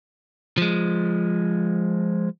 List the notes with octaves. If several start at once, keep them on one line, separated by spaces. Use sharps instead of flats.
F3 G#3